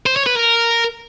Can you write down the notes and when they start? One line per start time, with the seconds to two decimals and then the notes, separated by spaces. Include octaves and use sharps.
0.06 C5
0.16 C#5
0.26 B4
0.36 A#4